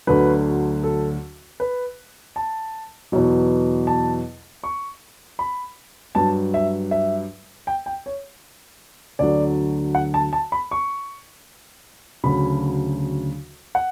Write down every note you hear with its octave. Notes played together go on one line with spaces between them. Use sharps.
D2 D3 F#3 B4
A4
B4
A5
E2 B2 F#3
A5
C#6
B5
G2 F#3 A5
E5
E5
G5
G5
C#5
D2 D3 F#3 D5
F#5
A5
A5
B5
C#6
D2 C#3 F#3 B5
F#5